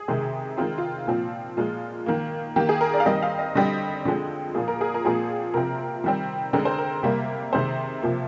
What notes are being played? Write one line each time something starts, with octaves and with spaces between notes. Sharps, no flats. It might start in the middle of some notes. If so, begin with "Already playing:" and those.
Already playing: G#4
C3 D#3 G#3 C4
D#3 G#3 C4 F4
F4
A#2 F3 C4
A#2 F3 G#3 F4
D#3 A#3
D#3 A#3 G4
G#4
A#4
D5
F5
D#3 G3 C4 D#5
F5
D#5
D3 G3 C4 D#5
D3 F3 G#3 C4
A#2 F3 A#3 G#4
A#4
G#4
A#4
A#2 F3 G#3 C4 G#4
C3 F3 C4 A#4
D#3 G3 C4
D3 G#3 C4 A#4
C5
A#4
C3 G3 A#3
C3 D#3 G#3 C4 C5
C3 F3 A#3